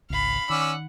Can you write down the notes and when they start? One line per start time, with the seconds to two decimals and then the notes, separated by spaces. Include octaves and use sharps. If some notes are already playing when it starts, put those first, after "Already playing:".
0.10 G#1 C#2 F5 B5
0.50 D#3 C#4 D5 F#5 E6